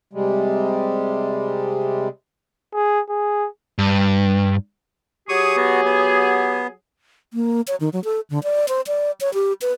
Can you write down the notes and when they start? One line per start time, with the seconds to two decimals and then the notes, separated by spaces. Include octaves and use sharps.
0.13 C3 G3 G#3
2.74 G#4
3.09 G#4
3.78 G2
5.29 F#3 G4 G#4 C#6 D#6
5.57 B3 F#4
5.85 B3
7.34 A#3
7.68 C#5
7.80 D#3
7.93 F#3
8.04 A4
8.30 D3
8.43 D5
8.68 C5
8.87 D5
9.21 C#5
9.34 G4
9.62 B4